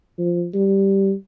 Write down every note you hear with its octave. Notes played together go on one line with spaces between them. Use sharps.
F3
G3